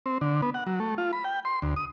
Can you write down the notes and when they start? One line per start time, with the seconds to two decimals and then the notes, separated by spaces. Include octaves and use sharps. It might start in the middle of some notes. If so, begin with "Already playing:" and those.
0.06 C4
0.21 D3
0.42 B3
0.54 F#5
0.67 F#3
0.80 A3
0.98 F4
1.13 B5
1.24 G5
1.45 C6
1.62 D2
1.76 D#6